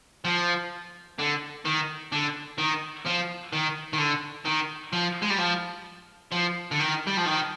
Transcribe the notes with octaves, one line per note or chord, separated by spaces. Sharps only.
F3
D3
D#3
D3
D#3
F3
D#3
D#3
D3
D#3
F3
G#3
G3
F3
F3
D3
D#3
G3
F3
D#3